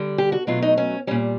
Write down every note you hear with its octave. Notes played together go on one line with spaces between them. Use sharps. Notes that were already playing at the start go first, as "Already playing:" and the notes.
Already playing: D3 G3
G4
F#4
B2 F#3 A3 F4
D#4
C#4
A#2 G3 C#4